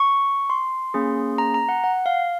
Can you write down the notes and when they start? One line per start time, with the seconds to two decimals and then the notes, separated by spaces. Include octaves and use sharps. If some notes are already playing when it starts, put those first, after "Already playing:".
Already playing: C#6
0.50 C6
0.94 A#3 C#4 G#4
1.38 A#5
1.54 A#5
1.69 F#5
1.84 F#5
2.06 F5